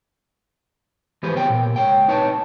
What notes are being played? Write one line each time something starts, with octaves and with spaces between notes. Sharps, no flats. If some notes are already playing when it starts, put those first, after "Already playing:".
E3 F3 G4 G#4 B4 C5
C#3 G3 B3 C#5 G5
A#2
C#2 C#5 G5
D#4 B4 C#5 G5 A5